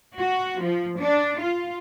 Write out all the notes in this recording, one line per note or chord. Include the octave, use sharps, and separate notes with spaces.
F#4
F3
D4
F4